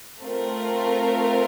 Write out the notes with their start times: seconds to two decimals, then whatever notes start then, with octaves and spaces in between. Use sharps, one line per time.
0.23 A3 C4 F4 A#4